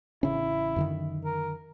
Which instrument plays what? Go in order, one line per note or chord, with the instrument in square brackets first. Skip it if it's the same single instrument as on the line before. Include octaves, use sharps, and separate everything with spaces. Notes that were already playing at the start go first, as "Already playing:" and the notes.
[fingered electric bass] A1 C#3 C#4 [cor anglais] E4
[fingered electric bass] F#2 D3 D#3
[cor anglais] A#4